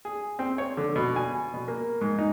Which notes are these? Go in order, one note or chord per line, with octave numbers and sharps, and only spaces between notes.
G#4
C4
C#5
D3
B2
G#5
B2
A#3
G#2
D#4